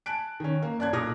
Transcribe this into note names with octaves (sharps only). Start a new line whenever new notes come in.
G#5 A5 F#6 D7
D#3 C#4
A#3
F#2 D5 A5 F#6 G#6
B1 A#2 D6 D#6 F6 A#6